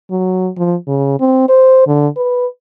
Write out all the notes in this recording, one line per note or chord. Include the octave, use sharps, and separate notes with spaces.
F#3
F3
C#3
C4
C5
D3
B4